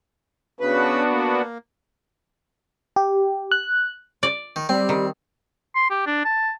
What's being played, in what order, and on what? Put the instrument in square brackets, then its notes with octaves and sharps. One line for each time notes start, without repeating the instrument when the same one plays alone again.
[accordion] C#3 B4 [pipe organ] B3 D4 F#4
[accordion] A#3
[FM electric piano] G4
F#6
[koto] D5
[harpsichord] D#3
[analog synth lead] G3 [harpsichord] C4
[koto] D#3
[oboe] C6
G4
D4
A5